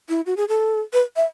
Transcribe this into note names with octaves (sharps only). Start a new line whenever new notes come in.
E4
F#4
G#4
A4
B4
E5